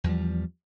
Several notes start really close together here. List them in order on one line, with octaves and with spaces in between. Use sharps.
E2 F3 G3